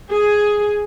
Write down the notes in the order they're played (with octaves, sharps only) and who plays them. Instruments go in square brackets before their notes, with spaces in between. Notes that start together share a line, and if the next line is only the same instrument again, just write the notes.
[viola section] G#4